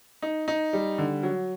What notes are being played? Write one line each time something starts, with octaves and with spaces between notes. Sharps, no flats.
D#4
D#4
G3
D3
F#3